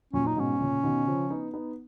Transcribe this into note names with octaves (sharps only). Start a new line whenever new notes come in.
F#2 A#2 C#4
D#4
G#2 B2 C#4
A#2 C#3
B2 D#3
C#3 F3
B3 D#4
B3 D#4